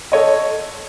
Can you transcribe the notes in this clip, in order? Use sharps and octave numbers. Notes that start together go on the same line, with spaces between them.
A4 C#5 D#5